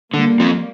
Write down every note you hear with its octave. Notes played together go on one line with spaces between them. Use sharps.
D3 G3 A#3
F3 C4